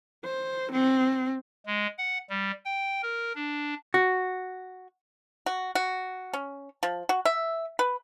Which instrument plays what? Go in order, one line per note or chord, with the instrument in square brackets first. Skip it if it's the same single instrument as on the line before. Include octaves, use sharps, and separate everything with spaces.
[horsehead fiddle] C5
C4
[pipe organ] G#3
F#5
G3
G5
A#4
D4
[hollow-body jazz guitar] F#4
[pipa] F#4
F#4
C#4
F3
F#4
E5
B4